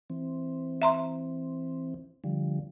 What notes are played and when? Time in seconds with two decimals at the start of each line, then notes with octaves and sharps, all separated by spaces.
0.10 E3 C4
0.82 E5 A#5 C6
2.24 D3 F3 G3